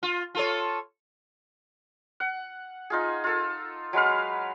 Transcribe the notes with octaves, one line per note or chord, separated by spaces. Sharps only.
F4
F4 A4 C#5
F#5
D#4 F4 G#4
F4 A4
F#3 G#3 B4 F5